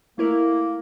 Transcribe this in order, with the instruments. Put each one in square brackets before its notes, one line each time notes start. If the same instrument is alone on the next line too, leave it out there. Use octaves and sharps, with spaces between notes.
[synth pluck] A3 E4 A#4 [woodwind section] A#3